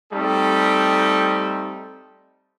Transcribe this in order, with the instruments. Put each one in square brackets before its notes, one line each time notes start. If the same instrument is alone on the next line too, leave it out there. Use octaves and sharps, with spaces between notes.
[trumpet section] G3 A3 C4 D#4 A4